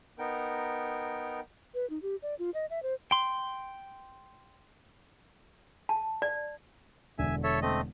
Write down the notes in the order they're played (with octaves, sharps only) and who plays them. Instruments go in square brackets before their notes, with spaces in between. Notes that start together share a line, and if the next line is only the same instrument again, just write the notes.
[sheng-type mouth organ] B3 D#4 A#4 G5
[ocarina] B4
D#4
G4
D5
F4
D#5
E5
C5
[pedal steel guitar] G5 C6
[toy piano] A5
D5
[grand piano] E1 D3 [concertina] E5 G#5
[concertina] A4 C#5 E5
A3 C4 D#5